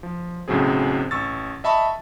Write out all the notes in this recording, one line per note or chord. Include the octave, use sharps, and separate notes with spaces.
F3
B1 A2 C#3 F#3 C4 G#4
A1 C#6 E6 A6
D#5 E5 A5 B5 C#6